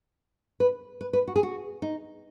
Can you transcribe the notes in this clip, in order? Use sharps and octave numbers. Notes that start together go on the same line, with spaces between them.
B4
B4
B4
F#4
G#4
F#4
D#4